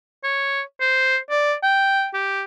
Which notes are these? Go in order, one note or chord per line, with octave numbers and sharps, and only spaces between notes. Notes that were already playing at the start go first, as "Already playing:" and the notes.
C#5
C5
D5
G5
G4